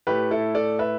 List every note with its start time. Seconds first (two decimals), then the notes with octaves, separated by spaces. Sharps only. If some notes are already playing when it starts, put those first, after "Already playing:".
0.07 A2 A3 G4 B4
0.31 E4 A4
0.55 A4 D5
0.79 B4 E5